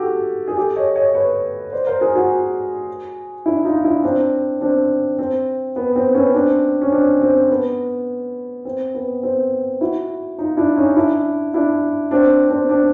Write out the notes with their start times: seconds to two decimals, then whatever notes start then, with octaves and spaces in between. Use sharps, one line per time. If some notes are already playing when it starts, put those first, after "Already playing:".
Already playing: F#4 G4 A4
0.48 G#4
0.57 G4 A4
0.76 C#5 D#5
0.96 C#5 D#5
1.15 B4 C#5
1.72 C5 D5
1.87 A#4 C5
2.01 G#4 A#4
2.16 F#4 G#4
3.46 D4 E4
3.64 D#4 F4
3.84 D4 E4
4.03 C4 D4
4.61 C4 D4
5.19 C4
5.76 B3
5.96 C4
6.15 B3 C#4
6.34 C4 D4
6.82 C#4
6.92 C4 D4
7.21 C4
7.50 B3
8.65 C4
8.94 B3
9.23 C4
9.81 E4 F#4
10.38 D#4 F4
10.57 D4 E4
10.76 C#4 D#4
10.96 D4 E4
11.54 D4 E4
12.11 C4 D4
12.50 C4 D4
12.69 C4 D4